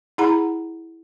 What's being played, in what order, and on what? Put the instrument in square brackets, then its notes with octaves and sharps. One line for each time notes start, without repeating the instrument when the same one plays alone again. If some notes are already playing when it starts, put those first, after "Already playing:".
[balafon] E4 G#4 F#5 A#5 B5